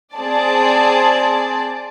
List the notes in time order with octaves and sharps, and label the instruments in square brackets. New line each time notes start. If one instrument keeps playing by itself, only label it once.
[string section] C4 G#4 D5 A5